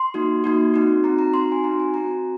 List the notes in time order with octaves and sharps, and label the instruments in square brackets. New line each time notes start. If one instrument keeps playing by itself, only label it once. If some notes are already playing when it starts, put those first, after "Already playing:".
Already playing: [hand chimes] C6
A#3 D#4 F#4
A#3 D#4 F#4
C4 D#4 F#4
C4 D#4 F#4 A#5
A#5
C4 D#4 F#4 C6
G#5
C4 D#4 F#4 A#5
G#5
C4 F#4 A#5